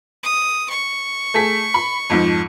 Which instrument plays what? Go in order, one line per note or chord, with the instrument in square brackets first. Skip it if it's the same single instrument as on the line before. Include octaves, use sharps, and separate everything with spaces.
[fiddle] D#6
C#6
[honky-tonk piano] A3 G#4 B6
B5
F2 G#2 F3